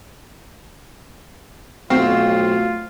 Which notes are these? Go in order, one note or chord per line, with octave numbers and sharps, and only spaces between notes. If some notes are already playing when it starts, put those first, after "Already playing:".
B1 A3 C4 F4 F#4 F5